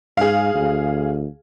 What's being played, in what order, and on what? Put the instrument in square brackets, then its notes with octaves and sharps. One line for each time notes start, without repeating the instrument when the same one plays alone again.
[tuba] G#2 [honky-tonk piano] G#4 F5
[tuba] D2